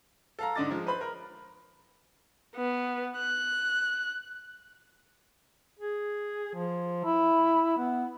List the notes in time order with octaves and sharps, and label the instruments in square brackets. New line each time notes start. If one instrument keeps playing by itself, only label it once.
[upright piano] A4 F5 A#5
G#2 D3 D4 D#5 D6 A6
F3 G#3
B4 C5 B5 C6
A#4
[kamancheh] B3
F#6
[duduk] G#4
F3
E4
B3